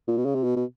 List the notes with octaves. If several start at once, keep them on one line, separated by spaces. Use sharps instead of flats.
A#2
B2
C#3
C3
B2
B2